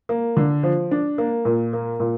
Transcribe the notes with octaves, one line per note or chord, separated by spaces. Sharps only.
A#3
D3
F3
D4
A#3
A#2
A#3
A#2